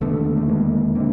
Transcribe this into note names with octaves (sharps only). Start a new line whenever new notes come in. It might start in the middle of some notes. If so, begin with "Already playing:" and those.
E1 D#2 D3 A3 B3
A3
G#3 A#3
D3 A#3 C4